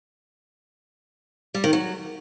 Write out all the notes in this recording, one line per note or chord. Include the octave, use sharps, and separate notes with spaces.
G3
D#3
F#3